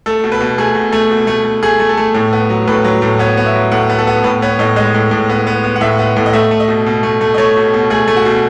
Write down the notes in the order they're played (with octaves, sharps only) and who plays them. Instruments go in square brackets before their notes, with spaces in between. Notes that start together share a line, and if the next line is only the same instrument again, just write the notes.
[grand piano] A3 A4
B2
B4
B2
A3 G#4
B2
A3
B2
A3
A3
A3 G#4
A3
A4
A3
A2
B3
F#3
A2 B4
F#3
A2
B3 C#5
B3
E5
F#3
A2 F#5
B3
A4
B3
A2 B4
B3 C#5
A2 D#5
G#3 D#5
A2
A2
B3
B3
B3
F#5
A2 E5
B3
A2
D#5
A3 E5
A3
D#5
B2
B2
A3
A3
D#5
A3 C#5
B2
B2
A3 G#4
A3
F#4
B2